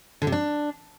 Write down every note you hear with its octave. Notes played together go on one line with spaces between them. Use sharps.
D3
C3
D4